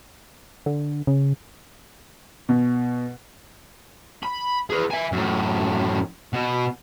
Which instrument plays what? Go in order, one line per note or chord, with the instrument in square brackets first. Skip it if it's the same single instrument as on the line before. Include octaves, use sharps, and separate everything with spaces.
[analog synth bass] D3
C#3
[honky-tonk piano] B2
[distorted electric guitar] B5
G#4 B4
E5 G#5
F#2 A2
B2